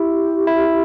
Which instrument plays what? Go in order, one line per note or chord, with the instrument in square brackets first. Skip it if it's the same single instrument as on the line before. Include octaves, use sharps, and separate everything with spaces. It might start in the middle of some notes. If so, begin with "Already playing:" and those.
Already playing: [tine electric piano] E4 [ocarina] G4
[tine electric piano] E4